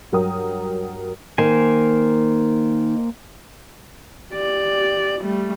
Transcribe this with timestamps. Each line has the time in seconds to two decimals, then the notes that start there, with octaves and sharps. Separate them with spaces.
0.12 G2 F#3 A#4 G5 D#6
1.38 D#3 A#3 C5 G#5
4.33 G4 D5
5.22 G3 A3